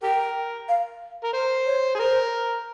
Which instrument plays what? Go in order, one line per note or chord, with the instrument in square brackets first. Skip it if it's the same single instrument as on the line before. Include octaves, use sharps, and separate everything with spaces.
[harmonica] G4 A#4 [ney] G5
[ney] F5
[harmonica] A#4
C5
[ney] C#5
[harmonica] G#4
[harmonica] A#4 [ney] C5